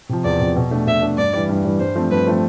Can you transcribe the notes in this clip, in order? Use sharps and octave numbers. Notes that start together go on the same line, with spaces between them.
C3 F3
E2 D5
C3 F3
B2
A3 D4
B2 E5
A3 D4
G2 D5
E3 G3
G2
E3 G3
G2 C5
F3 A3 C4
G2 B4
F3 A3 C4